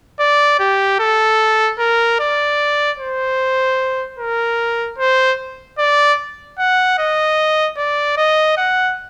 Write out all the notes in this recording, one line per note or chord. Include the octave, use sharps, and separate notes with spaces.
D5
G4
A4
A#4
D5
C5
A#4
C5
D5
F#5
D#5
D5
D#5
F#5